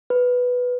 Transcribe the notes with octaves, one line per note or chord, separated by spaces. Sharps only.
B4